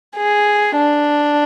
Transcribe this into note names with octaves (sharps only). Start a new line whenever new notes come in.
G#4
D4